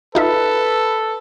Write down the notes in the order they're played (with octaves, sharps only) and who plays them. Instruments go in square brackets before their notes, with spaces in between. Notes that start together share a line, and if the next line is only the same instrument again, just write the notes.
[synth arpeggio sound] D#4 F4 E5 [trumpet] A4 [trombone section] B4